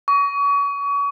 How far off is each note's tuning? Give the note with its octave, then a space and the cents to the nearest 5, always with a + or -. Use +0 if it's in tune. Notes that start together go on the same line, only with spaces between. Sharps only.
C#6 +35